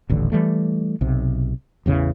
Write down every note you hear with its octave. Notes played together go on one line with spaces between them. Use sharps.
D#1 A1 D3
E3 G3 A3
B1 C3
A1 E2 C#3 E3